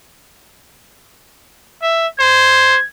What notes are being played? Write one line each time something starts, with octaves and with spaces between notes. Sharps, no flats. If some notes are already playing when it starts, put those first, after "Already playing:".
E5
C5 G#6